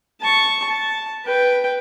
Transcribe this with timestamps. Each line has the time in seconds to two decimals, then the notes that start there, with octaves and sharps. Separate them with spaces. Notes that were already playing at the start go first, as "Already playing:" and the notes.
0.21 A5 C#6
0.69 A5
1.25 B4 G5